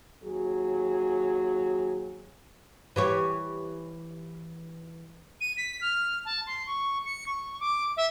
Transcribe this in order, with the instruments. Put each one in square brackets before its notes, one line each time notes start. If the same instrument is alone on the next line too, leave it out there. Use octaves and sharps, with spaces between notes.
[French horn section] D#2 F#3 G#4
[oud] E3 G4 C#5
[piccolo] D#7
B6
F6
A5
C6
C#6
C#7
C#6
D6
E5